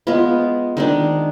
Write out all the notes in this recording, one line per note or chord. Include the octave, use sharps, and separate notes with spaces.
G#3 B3 F4
D#3 G#3 D4